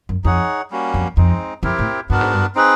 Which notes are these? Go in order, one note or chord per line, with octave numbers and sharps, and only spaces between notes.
F#2
F2 D#4 G#4 C#5 F#5
G3 A#3 C#4 F#4
F2
F2 G#3 C4 D#4
F2 C4 E4 G4 A#4
A2
G2 B3 D4 F#4 A#4
G#2
G2
C4 D#4 G#4 B4